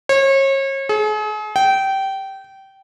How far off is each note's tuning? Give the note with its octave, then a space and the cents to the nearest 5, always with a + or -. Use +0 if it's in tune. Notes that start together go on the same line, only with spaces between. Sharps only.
C#5 -35
G#4 +40
G5 -20